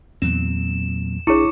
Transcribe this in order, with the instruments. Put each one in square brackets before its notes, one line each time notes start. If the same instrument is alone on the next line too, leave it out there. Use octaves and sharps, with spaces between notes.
[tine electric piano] E2 [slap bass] A#2 F#3 C4 [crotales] E7
[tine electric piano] B1 D4 G#4 [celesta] E4 C#5 [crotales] C#6 D6 C#7